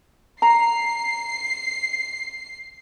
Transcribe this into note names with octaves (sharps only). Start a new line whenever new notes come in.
A#5 C7